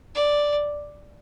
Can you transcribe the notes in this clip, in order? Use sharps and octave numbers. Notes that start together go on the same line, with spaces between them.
D5